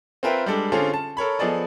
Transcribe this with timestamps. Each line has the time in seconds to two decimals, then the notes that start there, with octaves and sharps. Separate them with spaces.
0.23 C4 F4 A#4 B4 E5 G5
0.46 G3 G#3 D4 A4
0.72 D3 C4 C#4 F4 G#4 A4
0.94 A5
1.17 A4 A#4 C#5 B5
1.39 F3 B3 G#4 A4 D5 D#5